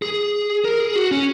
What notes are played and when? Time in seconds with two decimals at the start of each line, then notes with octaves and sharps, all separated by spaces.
0.02 G#4
0.65 A#4
0.80 G#4
0.95 F#4
1.11 C#4